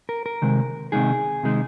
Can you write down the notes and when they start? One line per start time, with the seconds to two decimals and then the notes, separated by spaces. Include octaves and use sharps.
0.09 A#4
0.26 A#4
0.42 C3 D#3 G#3
0.92 C3 D#3 G#3 D#4 G#4
1.43 C3 D#3 G#3 D#4